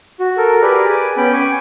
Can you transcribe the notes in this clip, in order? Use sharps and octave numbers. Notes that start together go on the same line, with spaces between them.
F#4
A4 A#4
G4 G#4 A#4 B4 D5
G#5 D6
B3 C#4 G5 B5
G5 G#5 C#6 D6